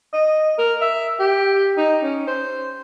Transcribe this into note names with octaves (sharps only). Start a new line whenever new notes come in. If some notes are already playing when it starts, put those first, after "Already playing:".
D#5
A#4
E5
G4
D#4
C#4
C5